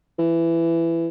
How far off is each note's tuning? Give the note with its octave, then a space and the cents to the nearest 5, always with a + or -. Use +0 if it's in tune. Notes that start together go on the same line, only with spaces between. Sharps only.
E3 +15